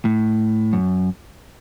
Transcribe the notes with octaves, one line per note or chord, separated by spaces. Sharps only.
A2
F#2